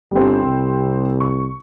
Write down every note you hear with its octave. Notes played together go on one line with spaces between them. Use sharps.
G1 G3 C4
C2
C#6